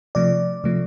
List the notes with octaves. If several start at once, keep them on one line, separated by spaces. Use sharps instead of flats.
C3 F3 A3 D5
C3 F3 A3